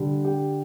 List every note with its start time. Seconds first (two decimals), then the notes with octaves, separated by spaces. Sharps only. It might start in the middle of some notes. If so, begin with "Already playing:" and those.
Already playing: D3 G3
0.25 G4